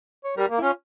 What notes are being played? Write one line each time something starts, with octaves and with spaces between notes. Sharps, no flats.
C#5
G3 A#4
A#3
E4
C#4 F4